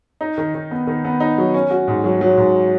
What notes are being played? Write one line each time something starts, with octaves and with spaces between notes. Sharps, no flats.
D#4
D#3
D#3
B3
D#3
B3
D#4
F#3
C#4
F#4
G#2
F#3
F#3
G#2